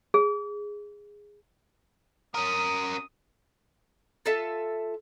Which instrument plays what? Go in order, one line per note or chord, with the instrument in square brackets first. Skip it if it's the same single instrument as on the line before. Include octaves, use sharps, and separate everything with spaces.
[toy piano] G#4
[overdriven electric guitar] C#4 A#4 [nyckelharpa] D#6
[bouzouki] F4 A4 E5 A5